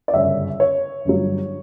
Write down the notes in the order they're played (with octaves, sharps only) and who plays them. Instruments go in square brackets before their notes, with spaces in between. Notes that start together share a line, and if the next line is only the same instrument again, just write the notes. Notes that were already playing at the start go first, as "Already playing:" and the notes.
[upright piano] D5
G1 F#2 C#3 E5
C#5
G1 G2 F#3